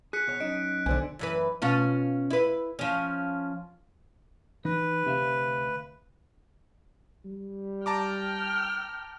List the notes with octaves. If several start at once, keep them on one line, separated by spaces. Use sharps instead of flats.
G#4 F#6 B6 C#7
B2 C#5
F#3 C#4 D#4 D#5 D7
B1 D3 C5 G#5
F#2 E3 B4
B2 C#4 F4
E4 B4
F3 C#4
E3 D#4 B4
D2 C3 E5 F5
G3
G5 A5 A#5 D6 F6